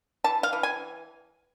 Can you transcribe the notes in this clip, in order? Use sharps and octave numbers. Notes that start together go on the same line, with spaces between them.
E3 A5
F5
E3
G#5